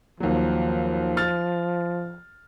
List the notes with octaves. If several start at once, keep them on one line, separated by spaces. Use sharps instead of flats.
D#2 F3 F#3
F6 A6